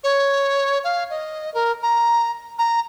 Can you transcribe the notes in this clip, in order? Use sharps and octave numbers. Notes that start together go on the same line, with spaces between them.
C#5
F5
D#5
A#4
A#5
A#5